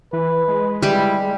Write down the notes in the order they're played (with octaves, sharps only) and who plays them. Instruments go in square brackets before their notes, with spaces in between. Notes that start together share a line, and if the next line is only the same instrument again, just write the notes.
[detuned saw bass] E3 [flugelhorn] B4
[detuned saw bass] G#3
[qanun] G3 G4 [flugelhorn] E4